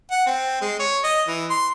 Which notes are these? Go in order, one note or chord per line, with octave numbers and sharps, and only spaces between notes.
F#5
C4
G#3
C#5
D#5
E3
C6